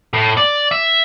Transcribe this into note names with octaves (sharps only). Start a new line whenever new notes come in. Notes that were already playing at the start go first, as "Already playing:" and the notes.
A2
D5
E5